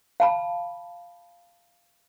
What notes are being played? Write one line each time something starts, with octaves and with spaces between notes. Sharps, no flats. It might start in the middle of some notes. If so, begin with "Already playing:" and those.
F5 A5 B5